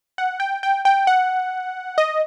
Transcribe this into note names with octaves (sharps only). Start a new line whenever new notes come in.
F#5
G5
G5
G5
F#5
D#5